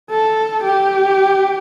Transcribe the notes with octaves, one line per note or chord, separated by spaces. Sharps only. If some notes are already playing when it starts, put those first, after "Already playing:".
A4
G4